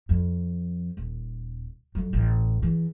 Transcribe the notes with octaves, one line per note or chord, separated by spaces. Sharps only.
F2
D#1
F2 F#3
A1
E2 E3